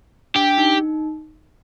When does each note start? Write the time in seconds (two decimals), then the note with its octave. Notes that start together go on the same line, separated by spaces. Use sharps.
0.35 D4 G4
0.58 D#4